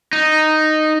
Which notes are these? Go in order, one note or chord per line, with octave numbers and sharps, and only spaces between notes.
D#4